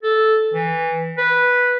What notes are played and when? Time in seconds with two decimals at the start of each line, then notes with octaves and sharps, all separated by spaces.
0.03 A4
0.54 E3
1.18 B4